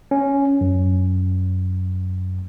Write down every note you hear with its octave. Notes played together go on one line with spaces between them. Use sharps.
C#4
F#2